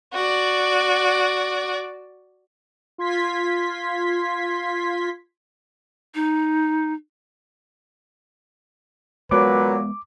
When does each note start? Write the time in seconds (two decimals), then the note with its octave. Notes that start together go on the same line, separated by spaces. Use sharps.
0.14 F#4 D5
2.98 F4 C6 G#6 B6
6.15 D#4
9.31 A#2 F#3 G#3 B3 B4 D6